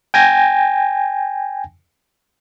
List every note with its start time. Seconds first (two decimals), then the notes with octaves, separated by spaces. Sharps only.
0.14 G5 G#5 A#6